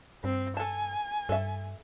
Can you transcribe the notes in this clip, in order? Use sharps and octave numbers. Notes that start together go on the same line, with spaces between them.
G2 C4
A4 G#5 A5
G2 A4 E5